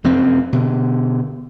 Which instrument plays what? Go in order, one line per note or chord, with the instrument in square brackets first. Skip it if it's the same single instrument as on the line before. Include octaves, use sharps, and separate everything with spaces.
[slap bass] F1 F#2 F3 C4
B2 D3